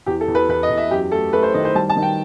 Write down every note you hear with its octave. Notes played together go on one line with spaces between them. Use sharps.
E2 G4
A4
E2
B4
E2 B4
D#5
E2
E5
F#2 G4
A3 A4
A3 B4
C5
D#3 D#5
C5
G3 A5
A5
D#3
G5